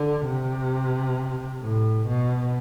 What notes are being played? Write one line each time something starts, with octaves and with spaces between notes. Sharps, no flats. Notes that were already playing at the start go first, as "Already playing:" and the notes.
Already playing: D3
C3
A2
B2